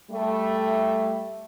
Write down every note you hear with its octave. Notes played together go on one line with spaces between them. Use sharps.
G3 A3